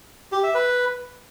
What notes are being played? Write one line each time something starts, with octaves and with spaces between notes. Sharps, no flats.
G4
E5
B4